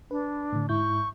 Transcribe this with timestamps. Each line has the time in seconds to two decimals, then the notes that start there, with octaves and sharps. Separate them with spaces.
0.11 D4 B4
0.53 A2 D3
0.69 G#2 E4 C#6 G6